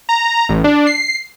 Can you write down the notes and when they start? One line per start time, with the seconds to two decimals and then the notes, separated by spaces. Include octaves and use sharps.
0.09 A#5
0.49 A1
0.64 D4
0.87 C7